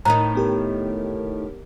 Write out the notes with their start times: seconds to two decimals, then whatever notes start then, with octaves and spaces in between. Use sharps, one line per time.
0.05 A2 D#3 D#4 C5 A#5
0.35 B3 G4 A#4